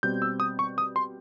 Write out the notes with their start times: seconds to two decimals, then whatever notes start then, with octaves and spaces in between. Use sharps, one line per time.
0.03 B2 G3 C4 G6
0.22 E6
0.40 D#6
0.59 C#6
0.78 D#6
0.96 C6